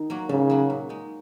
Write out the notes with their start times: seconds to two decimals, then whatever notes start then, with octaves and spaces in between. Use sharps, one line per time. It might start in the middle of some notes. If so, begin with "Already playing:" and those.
Already playing: D#3 D#4
0.10 F#3 A#3 F#4
0.29 G#2 C#3
0.50 F#3 A#3 F#4
0.70 A#2
0.89 G#3 D#4